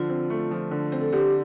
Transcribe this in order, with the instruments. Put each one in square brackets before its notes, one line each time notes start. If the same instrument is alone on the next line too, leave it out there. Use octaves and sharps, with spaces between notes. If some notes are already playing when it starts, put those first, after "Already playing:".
Already playing: [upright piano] D3 F3 [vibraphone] F4
[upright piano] C4
A3
F3
D3
C4
[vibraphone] A4
[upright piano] D3 [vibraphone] G4